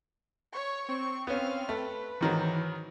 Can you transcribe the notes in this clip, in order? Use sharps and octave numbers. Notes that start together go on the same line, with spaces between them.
C#5 C#6
C4 C#6
B3 C#4 F5 F6
A3 B4
G#2 D#3 E3 F#3